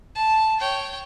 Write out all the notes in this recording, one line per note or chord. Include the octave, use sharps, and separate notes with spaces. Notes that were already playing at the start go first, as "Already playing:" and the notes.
A5
C#5 G5